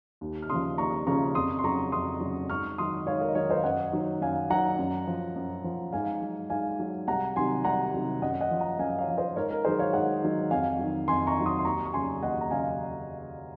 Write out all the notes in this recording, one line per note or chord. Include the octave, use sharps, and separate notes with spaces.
D#2
F6
C#3 F3 C6 D#6
D#2 A#5 C#6
C#3 F3 A#5 C#6
F2 C6 D#6
C6
C#3 F#3 A#5 C#6
F2 C6 D#6
C#3 F#3
G#2 C#6 F6
D#3 F#3 C6 D#6
G#2 C#5 F5
A#4 C#5
D#5
D#3 F#3 A#4 C#5
C5 D#5
F5
F#2 D#5 F#5
D#3 F#3
F#2 F5 G#5
D#3 F#3 F#5 A#5
F#2
F3
F#2
F3
G#2 F5 G#5
F#3
G#2 F5 G#5
F#3
C2 F#5 A#5
C3 D#3 F#3 G#5 C6
C2 F#5 A#5
C3 D#3 F#3
F#2 D#5 F#5
D#5 F#5
F3
F#5 A#5
F#2 F5 G#5
C#5 F5
F3
C5 D#5
G#2 A#4 C#5
A#4
D#3 F#3 G#4 C5
C#5 F5
G#2 D#5 F#5
D#3 F#3
F2 F5 G#5
D#3 F#3
F2 G#5 C6
A#5 C#6
D#3 F#3
C6 D#6
C6
D#2 A#5 C#6
C#6
C#3 F#3 G#5 C6
D#2 D#5 F#5
A#5
C#3 F#3 F5 G#5